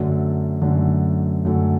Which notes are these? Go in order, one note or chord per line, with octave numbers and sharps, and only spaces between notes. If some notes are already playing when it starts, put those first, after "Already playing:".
Already playing: F#2 D3 F#3 A3
F#2 D3 F#3 A3
F#2 D3 F#3 A3